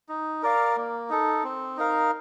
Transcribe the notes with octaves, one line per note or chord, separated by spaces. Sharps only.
D#4
A#4 D5 F5
A#3
D#4 A4
C4
D#4 A#4 F5